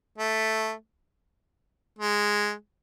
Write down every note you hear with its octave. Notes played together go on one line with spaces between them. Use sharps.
A3
G#3